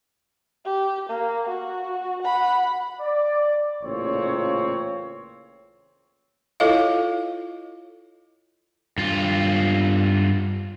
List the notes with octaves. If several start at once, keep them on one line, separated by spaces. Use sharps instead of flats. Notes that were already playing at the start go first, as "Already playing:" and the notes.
G4
A#3
F#4
F#5 B5
D5
A1 A#2 C#3 C4 C#5
E4 F4 A4 C#5 D#5 F5
G2 F4